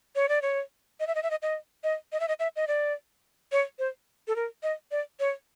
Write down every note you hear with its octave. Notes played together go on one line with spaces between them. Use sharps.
C#5
D5
C#5
D#5
E5
D#5
E5
D#5
D#5
D#5
D#5
E5
D#5
E5
D#5
D5
C#5
C5
A4
A#4
D#5
D5
C#5